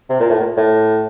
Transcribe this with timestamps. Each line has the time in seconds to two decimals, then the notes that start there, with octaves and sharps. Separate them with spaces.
0.10 C3
0.20 A#2
0.30 A2
0.40 A#2
0.57 A2